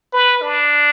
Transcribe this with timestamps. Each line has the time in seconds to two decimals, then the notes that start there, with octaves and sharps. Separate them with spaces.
0.13 B4
0.42 D4